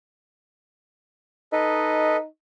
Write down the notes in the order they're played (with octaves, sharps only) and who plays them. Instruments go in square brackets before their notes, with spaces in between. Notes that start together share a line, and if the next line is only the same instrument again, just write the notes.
[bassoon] D#4 [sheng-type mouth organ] A4 B4 D#5